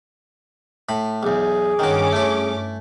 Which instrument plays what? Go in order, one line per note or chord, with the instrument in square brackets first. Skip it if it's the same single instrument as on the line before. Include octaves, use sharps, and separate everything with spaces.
[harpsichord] A2 B5
[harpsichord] B1 E2 [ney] G#4
[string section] G2 C#4 D6 [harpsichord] D#3 F#4
[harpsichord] A3 E4